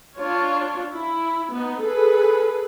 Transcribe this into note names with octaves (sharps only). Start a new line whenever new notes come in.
D4 F4 C#5
E4
B3 D#4
G#4 A4 B4